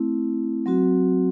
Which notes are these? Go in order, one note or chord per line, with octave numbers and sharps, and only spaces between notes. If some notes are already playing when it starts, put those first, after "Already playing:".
Already playing: A3 C4 E4
F#3 C4 F#4